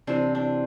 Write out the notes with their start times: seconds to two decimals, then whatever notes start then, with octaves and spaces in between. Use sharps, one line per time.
0.07 C3 E3 C4 D4
0.35 D4